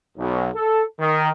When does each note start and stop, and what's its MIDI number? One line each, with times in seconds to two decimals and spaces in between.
0.18 0.48 35
0.54 0.82 69
0.99 1.29 51